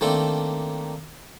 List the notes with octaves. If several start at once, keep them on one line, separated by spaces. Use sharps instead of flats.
D#3 A3 A#3 C4 D4 A4